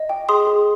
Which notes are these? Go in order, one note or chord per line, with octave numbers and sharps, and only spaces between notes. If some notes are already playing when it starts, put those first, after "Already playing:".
Already playing: D#5
G5
G#4 C6 D#6
G#4